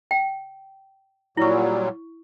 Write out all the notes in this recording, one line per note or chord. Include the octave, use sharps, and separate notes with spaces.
G5
A#2 F#3 G3 E4 C#6